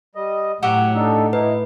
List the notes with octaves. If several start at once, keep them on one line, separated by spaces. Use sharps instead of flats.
G3 D#5
A2 F#3 F#4 G4 E5 F#5
D4 D#4 A4
D#4 E4 B4